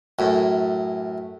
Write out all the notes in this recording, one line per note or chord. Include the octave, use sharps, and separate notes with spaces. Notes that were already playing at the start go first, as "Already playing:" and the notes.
F#2 A2